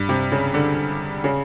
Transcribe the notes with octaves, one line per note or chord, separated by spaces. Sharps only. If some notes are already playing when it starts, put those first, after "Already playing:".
Already playing: G2
C3
C#3
D3
C#3